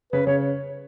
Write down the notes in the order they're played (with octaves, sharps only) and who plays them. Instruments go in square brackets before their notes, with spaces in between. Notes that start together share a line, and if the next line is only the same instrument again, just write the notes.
[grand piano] C#3 [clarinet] B4
[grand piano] C#3 [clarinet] C#5